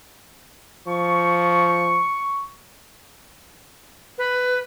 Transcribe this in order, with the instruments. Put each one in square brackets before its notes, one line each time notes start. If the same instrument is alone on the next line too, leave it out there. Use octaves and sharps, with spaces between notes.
[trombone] F3 [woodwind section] C#6
[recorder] B4